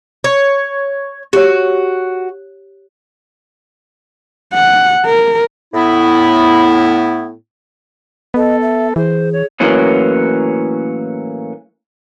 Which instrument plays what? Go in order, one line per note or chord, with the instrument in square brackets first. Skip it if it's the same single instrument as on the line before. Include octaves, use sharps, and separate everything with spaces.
[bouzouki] C#5
[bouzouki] F#4 [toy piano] G4 C#5
[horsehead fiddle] F#5
A#4
[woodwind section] A2 B3 E4
[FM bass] B3 [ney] A4 [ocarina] D#5
[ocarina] E5
[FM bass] E3 [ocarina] G#4 [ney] C5
[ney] C#5
[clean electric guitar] A2 E3 F#3 A#3 C#4